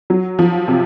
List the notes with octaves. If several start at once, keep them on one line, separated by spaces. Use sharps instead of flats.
F#3
F3
C3